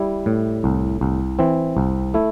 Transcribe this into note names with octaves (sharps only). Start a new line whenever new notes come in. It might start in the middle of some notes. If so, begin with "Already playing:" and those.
Already playing: G3 E4
A2
C2
C2
E3 C4
C2
A3 E4